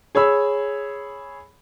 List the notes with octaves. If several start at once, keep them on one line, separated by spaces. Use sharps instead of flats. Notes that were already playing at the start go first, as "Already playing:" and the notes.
G#4 C#5 B5 E6